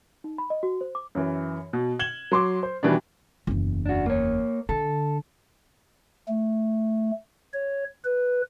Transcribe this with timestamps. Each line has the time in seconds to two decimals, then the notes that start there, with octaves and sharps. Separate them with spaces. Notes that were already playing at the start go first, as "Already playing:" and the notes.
0.24 D#4
0.38 B5
0.50 D#5
0.63 F#4
0.81 C5
0.95 D6
1.15 F#2 E3
1.73 B2
1.99 G#6 E7 F#7 G7
2.32 F#3 C6 D6
2.63 C5
2.83 B2 D#3 E3 G3 D4
3.47 F#1 E2
3.86 D4 F#4
4.06 A#3 C#5
4.69 D3 A4
6.29 A3
7.54 C#5
8.05 B4